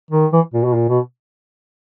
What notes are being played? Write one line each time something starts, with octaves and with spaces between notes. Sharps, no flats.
D#3
E3
A#2
B2
A#2
B2